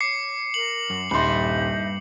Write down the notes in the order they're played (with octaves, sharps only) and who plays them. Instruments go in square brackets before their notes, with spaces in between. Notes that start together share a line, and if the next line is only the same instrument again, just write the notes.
[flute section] C#5 [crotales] D6 C7 C#7
[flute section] A#4 [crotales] F#7
[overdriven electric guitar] F#2
[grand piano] D#1 C6 [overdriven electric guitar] G2 B5 [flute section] D#4 E5